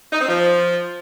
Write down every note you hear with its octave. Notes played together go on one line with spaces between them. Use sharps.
D#4
C4
F3